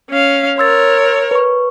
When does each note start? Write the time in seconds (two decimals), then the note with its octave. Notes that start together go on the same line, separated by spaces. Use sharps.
0.10 C#4 F5
0.58 A#4 C#5 C6 E6 A6
1.31 B4 C#6